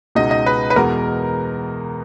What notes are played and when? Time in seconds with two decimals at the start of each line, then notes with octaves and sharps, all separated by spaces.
0.15 C#2 B2 G#3 D#4 D#5
0.31 D#5
0.46 B4
0.70 B4
0.76 E2 B2 G#3 B3 A#4